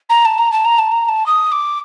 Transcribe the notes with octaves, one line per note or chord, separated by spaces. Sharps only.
A#5
A5
A#5
A5
A#5
A5
A#5
A#5
A5
D#6
D6